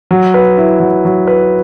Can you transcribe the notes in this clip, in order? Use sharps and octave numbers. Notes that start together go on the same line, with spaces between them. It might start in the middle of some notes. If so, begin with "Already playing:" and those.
F#3
B4
E4
F#3
F#3
B4